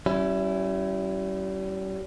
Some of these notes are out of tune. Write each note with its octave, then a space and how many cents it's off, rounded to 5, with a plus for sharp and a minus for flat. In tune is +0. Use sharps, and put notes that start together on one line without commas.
G3 -40 C#4 +0 E4 +10